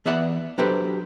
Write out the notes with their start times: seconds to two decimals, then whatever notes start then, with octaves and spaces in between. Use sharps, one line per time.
0.06 E3 B3 D5 E5 F#5 B5
0.58 F#3 D4 G4 A4 B4 C5